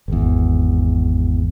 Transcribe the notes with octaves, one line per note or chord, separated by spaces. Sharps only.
G#1 E2